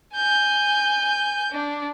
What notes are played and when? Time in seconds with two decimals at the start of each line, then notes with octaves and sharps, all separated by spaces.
0.15 G#5 G6
1.52 D4